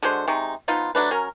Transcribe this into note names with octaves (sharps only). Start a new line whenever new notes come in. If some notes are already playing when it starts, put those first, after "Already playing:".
D3 G#3 F#4 C5
C3 G#3 D#4 C#6
F3 B3 D#4 F4
F#3 A3 D4 B4
F#3 C#4 A#4